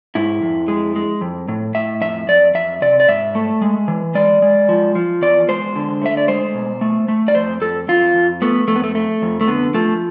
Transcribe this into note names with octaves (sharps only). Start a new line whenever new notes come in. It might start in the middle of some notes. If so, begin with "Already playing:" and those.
G#2 E4
F2
G#3
G#3
F2
A2
A2 E5
F2 E5
F2 D5
F2 E5
C3 D5
D5
G#2 E5
A3
G#3
E3
G#3 D5
G#3
F3
F3
E2 D5
G#3 C5
D3
A3 E5
D5
G#3 C5
B2
A3
A3
D5
F2 C5
F2 A4
F2 F4
F2
A3 B3
F2 A3
B3
A3
A3
F2
A3
D3 B3
F3 A3